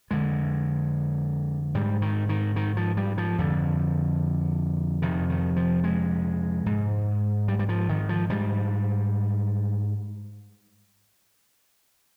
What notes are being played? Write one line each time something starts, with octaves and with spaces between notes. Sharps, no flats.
F2 D3 G#3
G#2 G3
D#3
D#3
D#3
F3
G3
F3
F2 D3
F2 C3 D#3
D#3
F3
G#3
G#2
G3
G3
F3
D#3
F3
G#2 G3